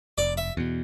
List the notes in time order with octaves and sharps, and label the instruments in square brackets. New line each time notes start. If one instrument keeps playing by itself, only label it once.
[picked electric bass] F1 [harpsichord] D5
[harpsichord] E5
[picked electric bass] E2 B2